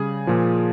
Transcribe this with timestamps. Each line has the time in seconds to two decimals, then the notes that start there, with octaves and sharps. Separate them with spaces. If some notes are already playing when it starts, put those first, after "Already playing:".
Already playing: C#3 G3 G#4
0.27 A#2 F3